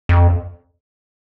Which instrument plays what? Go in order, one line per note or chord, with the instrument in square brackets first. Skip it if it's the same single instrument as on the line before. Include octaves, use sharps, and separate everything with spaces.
[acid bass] F2